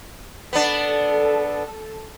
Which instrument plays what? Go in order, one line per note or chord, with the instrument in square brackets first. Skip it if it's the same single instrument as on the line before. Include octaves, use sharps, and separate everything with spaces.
[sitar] B3 D4 [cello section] A4